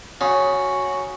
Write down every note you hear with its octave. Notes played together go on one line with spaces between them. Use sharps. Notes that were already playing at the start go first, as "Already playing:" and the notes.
C#3 F#4